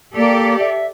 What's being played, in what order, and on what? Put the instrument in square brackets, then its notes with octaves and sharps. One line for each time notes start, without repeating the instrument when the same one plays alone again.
[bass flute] A#3 [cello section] G4 A4 D5
[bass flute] E5